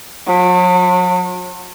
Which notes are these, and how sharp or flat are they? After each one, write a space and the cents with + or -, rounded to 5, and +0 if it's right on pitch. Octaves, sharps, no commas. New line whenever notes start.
F#3 -45